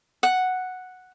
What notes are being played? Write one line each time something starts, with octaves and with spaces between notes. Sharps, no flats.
F#5